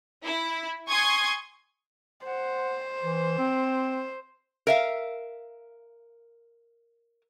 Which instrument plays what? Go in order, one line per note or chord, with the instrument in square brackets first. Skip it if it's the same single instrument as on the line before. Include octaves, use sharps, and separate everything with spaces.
[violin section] E4
G#5 C6 C#6 D#6 G#6
[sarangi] C5 [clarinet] F#5
[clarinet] E3
C4
[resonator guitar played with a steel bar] A#4 E5 F5